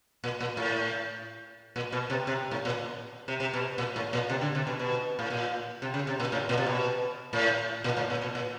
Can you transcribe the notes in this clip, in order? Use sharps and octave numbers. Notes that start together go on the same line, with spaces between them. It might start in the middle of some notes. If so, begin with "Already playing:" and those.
A#2
A#2
A2
A#2
B2
C3
C3
A2
A#2
C3
C3
B2
A#2
A2
A#2
C3
D3
C3
B2
B2
A2
A#2
C3
C#3
C3
A#2
A2
A#2
C3
B2
A2
A#2
A2
A#2
B2
A#2